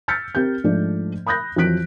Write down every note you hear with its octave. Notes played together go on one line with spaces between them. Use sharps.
E6 F6 G6 A6 B6 C#7
C4 G4 A#4 G6
G#2 F3 A3 D4
B5 D#6 F#6 G6 A#6
F2 E3 F#3 F#6 B6 D7